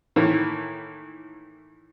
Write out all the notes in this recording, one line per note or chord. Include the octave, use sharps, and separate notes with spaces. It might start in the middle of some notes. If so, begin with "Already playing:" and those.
A2 D#3 E3 A#3